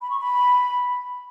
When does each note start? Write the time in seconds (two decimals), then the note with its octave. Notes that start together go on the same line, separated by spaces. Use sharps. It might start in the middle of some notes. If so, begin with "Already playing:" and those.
0.01 B5
0.10 C#6
0.18 B5